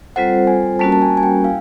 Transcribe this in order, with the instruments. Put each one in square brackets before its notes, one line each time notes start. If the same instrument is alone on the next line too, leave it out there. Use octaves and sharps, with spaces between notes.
[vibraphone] G3 C4 F4 A4 C5 [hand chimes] F#5
[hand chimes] G#5
[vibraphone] G3 A#3 C#4 F#4 A#4 [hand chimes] A5
[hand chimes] A5
G#5
G#5
G5
[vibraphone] E4 [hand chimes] F5